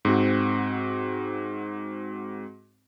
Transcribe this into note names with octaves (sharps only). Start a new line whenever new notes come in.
G#2 C4 F#4